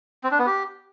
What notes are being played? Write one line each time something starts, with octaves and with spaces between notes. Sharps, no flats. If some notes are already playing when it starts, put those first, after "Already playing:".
C4
D4
B3
G4